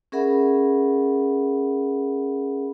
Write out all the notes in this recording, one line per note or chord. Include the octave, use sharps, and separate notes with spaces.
C#4 G#4 A#4 E5 F#5 B5